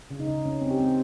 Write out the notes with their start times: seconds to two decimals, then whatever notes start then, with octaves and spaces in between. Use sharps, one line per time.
0.11 C#3
0.20 D#4
0.28 C#3
0.45 C#3 C#4
0.61 C4
0.71 G4
0.79 C4